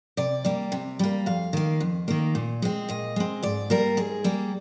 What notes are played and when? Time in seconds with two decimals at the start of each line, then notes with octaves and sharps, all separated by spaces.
0.17 C3 D5
0.45 G3 A#3
0.72 C3
0.99 G3 A#3
1.26 F2 F5
1.53 D#3 A#3
1.80 F2
2.08 D#3 A#3
2.35 A#2
2.62 G#3 C4
2.89 A#2 D#5
3.16 G#3 C4
3.43 G#2 D5
3.70 G3 A#3 A#4
3.97 G#2 G#4
4.24 G3 A#3